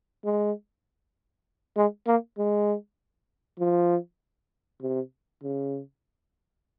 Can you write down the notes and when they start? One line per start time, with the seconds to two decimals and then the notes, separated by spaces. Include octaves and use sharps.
0.25 G#3
1.77 G#3
2.07 A#3
2.38 G#3
3.59 F3
4.82 C3
5.44 C#3